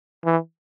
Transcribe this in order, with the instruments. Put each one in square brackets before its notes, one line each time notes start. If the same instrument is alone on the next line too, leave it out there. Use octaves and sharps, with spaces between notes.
[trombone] E3